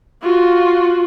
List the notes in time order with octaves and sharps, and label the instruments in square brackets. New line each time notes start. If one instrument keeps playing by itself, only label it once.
[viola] F4 F#4